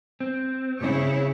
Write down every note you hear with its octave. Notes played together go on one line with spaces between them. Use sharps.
C4
C#3 E4 C#5